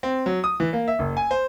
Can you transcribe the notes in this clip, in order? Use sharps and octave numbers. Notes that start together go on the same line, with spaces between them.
C4
F#3
D#6
E3
A#3
E5
F#1
G#5
C5